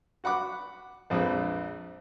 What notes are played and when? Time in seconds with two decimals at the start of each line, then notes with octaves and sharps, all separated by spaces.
0.24 F#4 F#5 B5 D6 F#6
1.10 A#1 F2 G#3 D4 B4